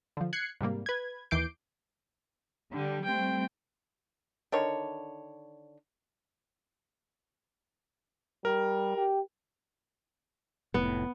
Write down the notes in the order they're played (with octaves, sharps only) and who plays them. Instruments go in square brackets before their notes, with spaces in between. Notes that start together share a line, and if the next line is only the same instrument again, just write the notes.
[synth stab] D3 F3
F#6 G#6 C7 C#7
G#2 C3 G3 A#3
B4 G#6
D#2 E3 D6 G6 C7 D7
[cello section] D3 [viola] G3
[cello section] G3 A3 C4 [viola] G5
[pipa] D3 D#3 C#5
[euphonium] G3 [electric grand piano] A#4
[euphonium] G4
[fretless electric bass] F1 A2 [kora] B3